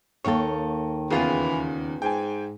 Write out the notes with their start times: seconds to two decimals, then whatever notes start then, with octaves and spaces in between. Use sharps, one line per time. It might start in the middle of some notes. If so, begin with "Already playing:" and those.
0.25 D#2 D#3 A#3 A4 C#5 C#6
1.10 E2 C#3 E3 B3 F4 G#4
2.02 G#2 G5 G#5